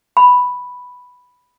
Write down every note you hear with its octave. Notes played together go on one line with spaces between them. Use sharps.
B5